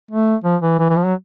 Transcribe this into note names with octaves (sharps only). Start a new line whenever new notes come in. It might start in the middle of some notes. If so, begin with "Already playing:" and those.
A3
F3
E3
E3
E3
F3
F#3